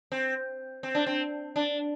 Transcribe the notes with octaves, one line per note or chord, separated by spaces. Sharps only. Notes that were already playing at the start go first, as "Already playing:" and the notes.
C4
C4
D4
C4
D4